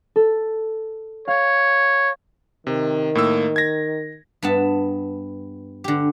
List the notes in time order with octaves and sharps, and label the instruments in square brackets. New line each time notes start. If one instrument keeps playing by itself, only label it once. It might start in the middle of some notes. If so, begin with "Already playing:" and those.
[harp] A4
[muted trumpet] C#5 [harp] F5
[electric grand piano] C3 [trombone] D#3
[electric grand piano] A2 A#3 E6
G#6 A#6
[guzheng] G2 B3 A5
D3 G4